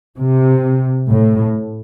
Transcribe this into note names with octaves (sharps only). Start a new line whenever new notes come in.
C3
A2